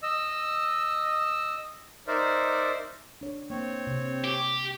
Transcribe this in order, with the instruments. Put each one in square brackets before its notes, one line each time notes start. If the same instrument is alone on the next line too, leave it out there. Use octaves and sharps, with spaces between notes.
[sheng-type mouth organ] D#5 E6
D#4 A#4 C5 D5 E5
[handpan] D4 C#5
[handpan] A#3 [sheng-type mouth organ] C4 C#5
[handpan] C3
[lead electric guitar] G4